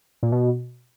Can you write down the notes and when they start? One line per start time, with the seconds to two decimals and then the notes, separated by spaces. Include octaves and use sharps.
0.23 A#2
0.32 B2